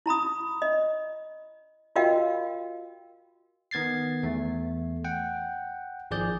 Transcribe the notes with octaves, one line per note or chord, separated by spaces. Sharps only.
E4 A#5 B5 D#6
D#5
F4 F#4 A#4 D#5 F5 G5
D#3 B3 G#6 A6 C7
E2 A3
F#5 G5
G#1 F3 G#4 D5 G6